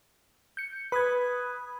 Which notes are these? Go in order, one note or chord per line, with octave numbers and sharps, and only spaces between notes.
G6 C#7
B4 B5 D#6 G#6